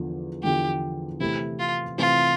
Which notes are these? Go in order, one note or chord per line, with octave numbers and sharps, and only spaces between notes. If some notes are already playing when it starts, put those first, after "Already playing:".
Already playing: E2 D3 F3
E2 D3 F3 G4
C3 E3 A3 C4 E4 G4
F4
C3 E3 A3 C4 F4 G4